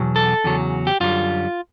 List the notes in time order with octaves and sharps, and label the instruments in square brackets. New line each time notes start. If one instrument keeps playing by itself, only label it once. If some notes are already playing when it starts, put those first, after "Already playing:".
Already playing: [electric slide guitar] E2 B2 F#3
A4
E2 C#3 F#3
G4
F#2 D3 G3 F4